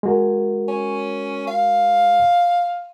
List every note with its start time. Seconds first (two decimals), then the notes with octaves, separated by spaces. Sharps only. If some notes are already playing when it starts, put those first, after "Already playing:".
0.03 G#3 F#4 A#4
0.68 C#4
1.47 F5